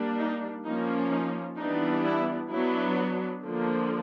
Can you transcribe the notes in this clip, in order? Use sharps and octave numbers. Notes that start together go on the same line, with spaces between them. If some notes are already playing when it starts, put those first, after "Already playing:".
Already playing: G3 A#3 D4
D#4
F3 A#3 C#4 D#4
D#4
E3 G3 B3 D4 D#4
E4
F#3 B3 D4 E4
D3 F3 A#3